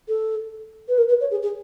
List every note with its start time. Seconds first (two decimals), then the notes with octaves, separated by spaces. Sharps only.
0.08 A4
0.88 B4
0.98 A#4
1.09 B4
1.21 C#5
1.31 G#4
1.42 G#4